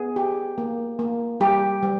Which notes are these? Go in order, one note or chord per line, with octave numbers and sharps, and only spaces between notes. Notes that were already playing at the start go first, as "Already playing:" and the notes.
Already playing: B3 G#4
G4
A#3
A#3
G3 G4
G3